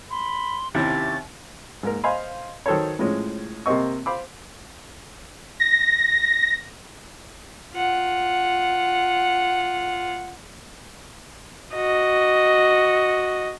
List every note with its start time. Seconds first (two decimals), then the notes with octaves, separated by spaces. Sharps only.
0.11 B5 C6
0.75 D#2 C3 C#4 E4 G4 C#5 A6
1.83 G#2 A#3 A#4
2.04 C5 D#5 F5 G#5 B5 C6
2.66 D#3 F#3 A4 C5 C#5
2.99 A2 F3 G#3 C#4
3.66 C3 A#3 C4 D#5 C#6
4.06 C5 F5 B5 D6
5.60 A#6
7.73 F4 F#5
11.75 F#4 D#5